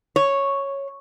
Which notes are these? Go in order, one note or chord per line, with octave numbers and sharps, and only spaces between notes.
C#5